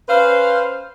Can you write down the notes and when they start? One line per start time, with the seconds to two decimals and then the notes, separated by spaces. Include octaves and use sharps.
0.09 C#4 B4 C5 F5